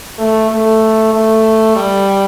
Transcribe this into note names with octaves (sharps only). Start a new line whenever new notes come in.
A3
A3
A3
G3